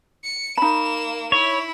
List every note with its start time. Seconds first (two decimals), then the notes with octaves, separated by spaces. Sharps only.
0.24 C#7
0.58 A#3 D#4 B5 E7
1.32 E4 C#5